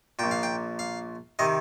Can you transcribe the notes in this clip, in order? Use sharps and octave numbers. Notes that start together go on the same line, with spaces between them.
A#1 A#2 G5
F5
G5
F5
C3 D#3 D#5